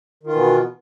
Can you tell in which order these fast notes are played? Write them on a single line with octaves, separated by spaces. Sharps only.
D#3 F4 E3 B2 B3